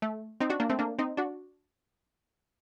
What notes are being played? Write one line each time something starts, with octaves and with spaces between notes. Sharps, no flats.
A3
C4 D#4
D4 F#4
A#3 D4
A3 C4
A#3 D4
C4 D#4
D4 F#4